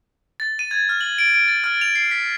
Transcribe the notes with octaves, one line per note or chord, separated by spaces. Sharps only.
A6
D#7
G#6
F6
F#7
D7
D7
A6
F6
F7
C7
B6